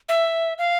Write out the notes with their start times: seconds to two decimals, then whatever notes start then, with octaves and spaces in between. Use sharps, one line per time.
0.09 E5
0.58 F5